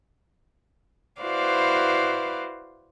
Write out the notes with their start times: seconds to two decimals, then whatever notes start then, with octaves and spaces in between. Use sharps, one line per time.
1.22 E4 F#4 B4 C5 D5 F5